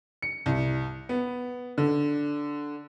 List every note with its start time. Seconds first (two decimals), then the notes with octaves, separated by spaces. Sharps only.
0.22 C#7
0.46 C2
1.09 B3
1.78 D3